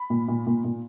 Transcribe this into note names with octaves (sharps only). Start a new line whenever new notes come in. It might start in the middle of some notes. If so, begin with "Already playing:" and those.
Already playing: B5
A#2
A#2
A#2
A#2